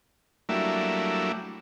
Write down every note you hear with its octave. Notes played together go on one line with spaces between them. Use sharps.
F#3 G3 A3 A#3 D4 E4